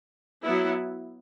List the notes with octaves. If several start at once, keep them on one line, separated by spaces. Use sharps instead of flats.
F#3 B3 E4